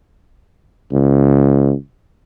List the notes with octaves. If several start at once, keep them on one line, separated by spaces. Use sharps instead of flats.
C#2